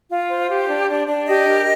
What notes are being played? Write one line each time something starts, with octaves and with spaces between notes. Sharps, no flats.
F4
C5
G4
D4
D4
D4
G4 D#5
A#4